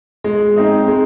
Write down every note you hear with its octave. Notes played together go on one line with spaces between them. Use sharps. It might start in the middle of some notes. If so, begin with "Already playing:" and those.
G#3
C4 D#4 G#4
G#3